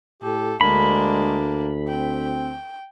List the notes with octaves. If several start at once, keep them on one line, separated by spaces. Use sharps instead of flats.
A2 G4 A4
D2 G#3 A#3 D4 B5
C4 G5